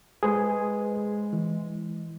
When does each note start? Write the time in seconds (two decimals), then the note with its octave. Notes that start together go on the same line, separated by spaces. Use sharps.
0.23 G#3 G#4 B4 C5
1.33 E3